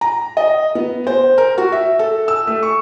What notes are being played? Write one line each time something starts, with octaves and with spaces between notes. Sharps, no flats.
A#5
D#5
B3
C5
A#4
F#4
E5
A4
E6
A3
C#6